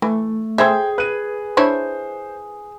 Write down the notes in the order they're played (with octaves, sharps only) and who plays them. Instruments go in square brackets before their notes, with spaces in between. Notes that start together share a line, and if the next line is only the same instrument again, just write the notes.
[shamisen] E3 [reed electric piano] A3
[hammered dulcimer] G#4 [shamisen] A4 C5 E5 [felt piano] G5 C6 G#6
[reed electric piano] B4 [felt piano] F#6 D#7
[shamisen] D4 E4 C#5 [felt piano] C5